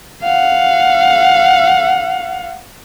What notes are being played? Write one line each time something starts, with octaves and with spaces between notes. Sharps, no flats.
F5 F#5